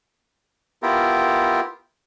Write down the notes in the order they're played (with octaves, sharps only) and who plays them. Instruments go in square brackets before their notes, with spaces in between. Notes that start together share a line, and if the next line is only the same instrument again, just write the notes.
[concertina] B3 E4 F4 G4 A#4